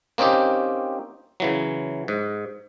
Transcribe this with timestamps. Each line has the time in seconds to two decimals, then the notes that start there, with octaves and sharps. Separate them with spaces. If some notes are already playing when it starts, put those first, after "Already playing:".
0.18 A#3 C4 C#4 D#4 G4
1.40 C#3 E3 F#3
2.08 G#2